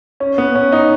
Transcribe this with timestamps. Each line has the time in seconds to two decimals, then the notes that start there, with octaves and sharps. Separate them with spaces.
0.20 C#4
0.38 B3
0.55 C#4
0.72 D#4